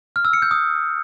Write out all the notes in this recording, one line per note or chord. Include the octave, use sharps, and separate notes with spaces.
F6
E6
C#7
G6
D#6